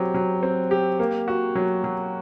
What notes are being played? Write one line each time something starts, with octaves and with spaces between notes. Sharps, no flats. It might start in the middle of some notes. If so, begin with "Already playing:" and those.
Already playing: F#3 C4 G4
F#3
C4
G4
A#3
F#4
F#3
F#3